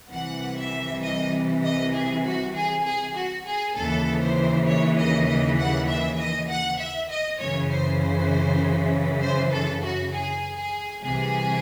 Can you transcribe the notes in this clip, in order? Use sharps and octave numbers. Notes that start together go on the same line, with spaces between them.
C2 C3 E3 F#5
E5
D#5
D#5
G#4
F#4
G#4
G#4
F#4
G#4
D#2 C#3 E3 A4
C5
C#5
D#5
D#5
F#5
E5
D#5
F#5
E5
D#5
F#2 C#3 E3 C#5
C5
C5
C5
A4
F#4
G#4
G#4
C2 C3 E3 G#4